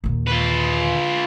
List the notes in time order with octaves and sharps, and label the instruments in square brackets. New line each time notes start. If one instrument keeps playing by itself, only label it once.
[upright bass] D#2 A#2
[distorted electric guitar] F4 B4